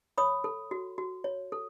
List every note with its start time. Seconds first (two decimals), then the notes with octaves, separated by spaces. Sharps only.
0.18 C#5 B5 D#6
0.44 A4
0.71 F#4
0.98 F#4
1.24 C#5
1.52 A4